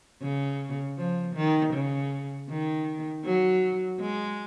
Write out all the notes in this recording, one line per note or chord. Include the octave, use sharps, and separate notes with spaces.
C#3
F3
D#3
C#3
D#3
F#3
G#3